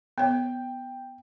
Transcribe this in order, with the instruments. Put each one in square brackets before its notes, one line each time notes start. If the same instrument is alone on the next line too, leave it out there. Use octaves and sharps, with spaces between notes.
[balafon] B3 C#5 [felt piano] G5